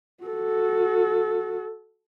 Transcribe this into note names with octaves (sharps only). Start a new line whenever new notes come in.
F#4 A4